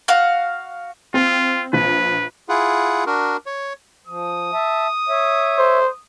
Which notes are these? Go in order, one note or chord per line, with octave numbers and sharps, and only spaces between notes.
F#4 F5
C4 F4
A#1 B4
E4 F4 G#4 F#5
D4 F#4 A#4
C#5
F3 D#6
E5 A5
C#5 E5
C5